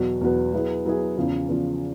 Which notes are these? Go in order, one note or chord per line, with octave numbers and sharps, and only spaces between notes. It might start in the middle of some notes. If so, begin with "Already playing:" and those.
Already playing: E2 B2 F#3 B3
E2 B2 F#3 B3
F#3 B3 E4 G#4
F#3 B3 E4 G#4
E2 C#3 F3
E2 C#3 F3